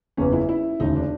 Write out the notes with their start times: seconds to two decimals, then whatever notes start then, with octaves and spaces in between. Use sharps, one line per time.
0.17 F#1 E2 C#3 E3 C#4
0.33 E4
0.49 E4
0.80 E1 D2 C#3 D#4
0.96 D4